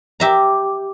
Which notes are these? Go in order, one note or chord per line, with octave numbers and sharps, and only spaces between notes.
G4 E5 A#5